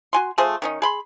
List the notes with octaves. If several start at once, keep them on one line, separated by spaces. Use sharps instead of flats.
F#4 G#5 C6
F3 A3 G#4 C5
D#3 C#4 D#4
G#4 B5 C6